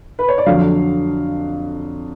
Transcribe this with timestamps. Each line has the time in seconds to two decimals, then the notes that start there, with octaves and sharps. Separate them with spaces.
0.19 B4
0.29 C#5
0.38 D5
0.46 F2 D3 F#3 F5